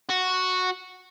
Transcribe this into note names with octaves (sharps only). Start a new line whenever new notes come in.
F#4